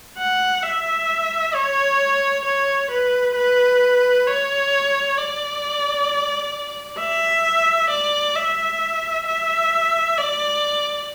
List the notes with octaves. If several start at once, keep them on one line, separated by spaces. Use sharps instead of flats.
F#5
E5
C#5
C#5
B4
B4
C#5
D5
E5
D5
E5
E5
D5